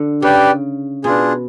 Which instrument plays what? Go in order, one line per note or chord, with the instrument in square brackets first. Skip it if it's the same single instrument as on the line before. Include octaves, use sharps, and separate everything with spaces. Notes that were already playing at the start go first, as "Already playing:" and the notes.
Already playing: [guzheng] D3
[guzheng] C#3 [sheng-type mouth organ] G4 B4 D5 G5
[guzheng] B2 [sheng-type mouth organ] D4 F4 G#4